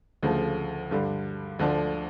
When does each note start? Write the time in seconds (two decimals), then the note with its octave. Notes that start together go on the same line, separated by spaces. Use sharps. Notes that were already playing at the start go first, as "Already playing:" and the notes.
0.23 D2 C#3 F3 A3
0.91 G2 D3 G3
1.59 D2 D3 F3 A3 D4